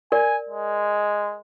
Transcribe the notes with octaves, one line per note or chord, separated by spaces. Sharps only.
A#4 D5 G#5
G#3